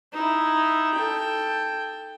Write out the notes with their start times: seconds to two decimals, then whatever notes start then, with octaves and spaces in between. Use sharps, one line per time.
0.13 D#4 E4
0.94 A4 G5